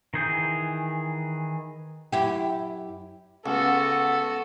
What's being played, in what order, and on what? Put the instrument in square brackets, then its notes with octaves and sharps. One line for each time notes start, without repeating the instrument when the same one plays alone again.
[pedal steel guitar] D#3 E3 G#4 G6
[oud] F#2 E4 G4
[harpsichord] C#2 [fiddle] B3 F#4 [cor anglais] A4